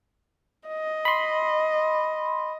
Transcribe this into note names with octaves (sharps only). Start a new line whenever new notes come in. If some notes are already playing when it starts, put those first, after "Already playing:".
D#5
B5 C6